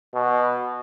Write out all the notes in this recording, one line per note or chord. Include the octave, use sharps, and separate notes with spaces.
B2